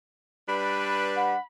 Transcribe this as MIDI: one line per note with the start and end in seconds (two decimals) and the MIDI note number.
0.49 1.35 55
0.49 1.35 62
0.49 1.35 71
0.49 1.41 83
1.16 1.40 78